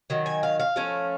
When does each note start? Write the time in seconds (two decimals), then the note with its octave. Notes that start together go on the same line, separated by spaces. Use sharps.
0.10 D#3 F#3
0.26 G#5
0.43 F5
0.60 F5
0.76 F3 A3 C#4